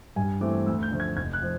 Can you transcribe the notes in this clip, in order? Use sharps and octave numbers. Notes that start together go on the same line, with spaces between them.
G2 G#5
E3 A3 C4 D6
D2 E6
G6
D3 F3 A3
G#6
F1 G#6
F#6
F3